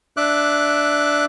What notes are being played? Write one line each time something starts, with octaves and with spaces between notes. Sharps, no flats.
D4 E5 D6 F#6